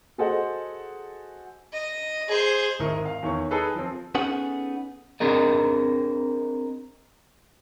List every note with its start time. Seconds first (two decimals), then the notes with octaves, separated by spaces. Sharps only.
0.18 F#4 G#4 A4 C5 D#5 F#5
1.72 D#5
2.28 G#4 C5
2.79 G#1 A2 D#4 A#4
3.05 F5
3.23 E2 D#3 C#5 C#6
3.51 D#4 G#4 A4 B4
3.75 F3 C4
4.15 B3 C#4 D#4 G#4 A4 F#5
5.20 C4 D4 G#4 A#4 D#5